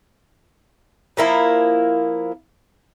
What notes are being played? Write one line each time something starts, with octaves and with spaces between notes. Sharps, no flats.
F3 A#3 E4 A#4